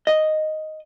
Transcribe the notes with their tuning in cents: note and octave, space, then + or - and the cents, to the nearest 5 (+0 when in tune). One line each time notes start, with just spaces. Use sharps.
D#5 +0